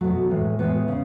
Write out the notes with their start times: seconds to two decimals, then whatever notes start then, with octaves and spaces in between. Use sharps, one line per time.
0.01 B2 F#3 A3
0.30 A2 E3 G#3
0.59 A2 E3 G#3 B3
0.88 C#3